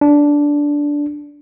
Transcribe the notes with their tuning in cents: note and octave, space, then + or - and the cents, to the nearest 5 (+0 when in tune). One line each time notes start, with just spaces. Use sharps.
D4 -10